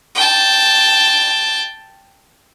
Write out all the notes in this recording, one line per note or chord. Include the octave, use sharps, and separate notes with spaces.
G5 A5